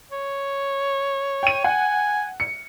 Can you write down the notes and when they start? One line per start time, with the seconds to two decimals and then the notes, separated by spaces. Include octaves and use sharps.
0.12 C#5
1.43 G5 D#7
1.64 F#5 G#5
2.40 C#7